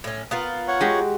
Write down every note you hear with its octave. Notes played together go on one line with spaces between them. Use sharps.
A2 C#4
B3 F4 A#4
C#5 F#5
G#3 F#4 G4